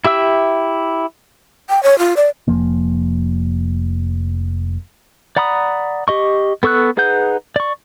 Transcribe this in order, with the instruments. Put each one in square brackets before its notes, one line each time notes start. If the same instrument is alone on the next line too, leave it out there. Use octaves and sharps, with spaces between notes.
[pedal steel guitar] E4 G4 E5 E6
[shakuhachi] G5
C#5
F4
D5
[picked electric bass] F1 F3 A#3
[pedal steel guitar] D5 F#5 A#5 B5 D#6
G4 D#5 C#6
B3 A4 C#6 E6 F#6
D#4 G#4 B4 F#5 G6
D5 C#6